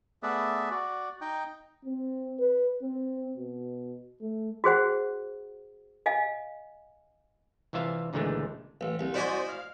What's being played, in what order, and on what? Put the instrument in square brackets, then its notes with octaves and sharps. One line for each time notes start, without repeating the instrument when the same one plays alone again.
[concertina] A3 B3 G#4 B4 D5 E5
F#4 D5
D#4 D#5 G5
[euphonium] C4
B4
C4
B2
A3
[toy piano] F#4 G#4 C5 F#5
D#5 F5 G#5
[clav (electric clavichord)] C2 E3 F4 E5 F5
C#2 A#2 D3 E3 G#3 A3
[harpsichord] A1
C2
[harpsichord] E4 D#5 G#5 [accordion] F#4 C5 D5
[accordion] F5 F6